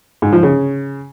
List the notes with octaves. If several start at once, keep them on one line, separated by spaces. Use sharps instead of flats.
G#2
F3
C#3